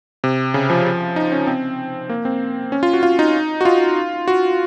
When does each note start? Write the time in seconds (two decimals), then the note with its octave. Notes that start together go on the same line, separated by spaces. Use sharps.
0.24 C3
0.54 C#3
0.70 F3
1.16 D#4
1.32 C#4
1.47 C4
2.09 A#3
2.25 C4
2.72 C#4
2.83 F4
2.93 F#4
3.03 F4
3.19 D#4
3.61 F#4
3.65 F4
4.28 F#4